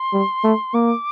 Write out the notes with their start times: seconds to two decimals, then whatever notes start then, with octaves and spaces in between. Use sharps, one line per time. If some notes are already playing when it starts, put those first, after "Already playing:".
Already playing: C6
0.13 G3
0.44 A3
0.74 A#3 D6